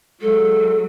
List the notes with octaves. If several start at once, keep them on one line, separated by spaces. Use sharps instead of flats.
F#3 G#3 A4